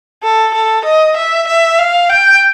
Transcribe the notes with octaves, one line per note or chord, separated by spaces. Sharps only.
A4
A4
D#5
E5
E5
F5
G5